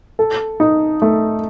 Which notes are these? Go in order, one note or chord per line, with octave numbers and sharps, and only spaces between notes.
A4
D#4
A3